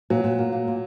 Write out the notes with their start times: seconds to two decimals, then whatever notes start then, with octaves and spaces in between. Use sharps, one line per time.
0.10 A#2 F#3
0.24 A#2
0.39 A#3
0.52 A#3
0.67 A#2